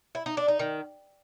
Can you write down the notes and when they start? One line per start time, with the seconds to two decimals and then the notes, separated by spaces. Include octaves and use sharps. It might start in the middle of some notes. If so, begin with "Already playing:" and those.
0.15 E4
0.26 D#4
0.37 D4
0.48 D#4
0.59 D#3